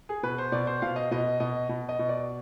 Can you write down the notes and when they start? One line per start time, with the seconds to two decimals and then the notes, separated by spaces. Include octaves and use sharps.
0.09 G#4
0.23 B2 B4
0.38 C5
0.52 B2 D5
0.67 C5
0.82 B2 F5
0.96 D#5
1.11 B2 D#5
1.40 B2 D#5
1.69 B2
1.89 D#5
1.99 B2
2.09 D5